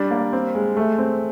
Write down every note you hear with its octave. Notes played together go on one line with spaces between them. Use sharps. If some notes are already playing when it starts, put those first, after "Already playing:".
Already playing: G3 D4
A#3
C4
G#3
A3
C4